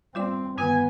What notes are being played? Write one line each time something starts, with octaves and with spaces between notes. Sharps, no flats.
G3 C4 F4 D5
G2 D3 D#3 B3 G#5